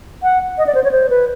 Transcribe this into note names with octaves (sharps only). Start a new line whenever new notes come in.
F#5
D#5
D5
C5
C#5
C5
B4